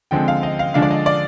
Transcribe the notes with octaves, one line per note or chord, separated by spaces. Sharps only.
D3 F3 G#3 C4 G5
F5
D#5
F5
D3 F3 G#3 D4 F5
D5
D#5
D5